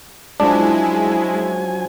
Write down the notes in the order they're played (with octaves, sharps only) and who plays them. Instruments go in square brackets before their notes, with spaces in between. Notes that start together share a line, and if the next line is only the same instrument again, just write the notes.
[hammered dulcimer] F3 C#4 [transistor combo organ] F#3 G#5 [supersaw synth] G#3 E4 [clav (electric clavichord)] D4